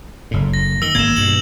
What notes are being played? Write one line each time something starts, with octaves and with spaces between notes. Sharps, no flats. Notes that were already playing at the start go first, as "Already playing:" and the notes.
F#1 A2
A#6
D#3 E6 G7
G#1 A#3 G#6 E7
G2 B2 F#7